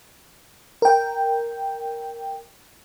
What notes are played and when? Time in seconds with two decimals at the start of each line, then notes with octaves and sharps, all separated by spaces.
0.82 A#4 G5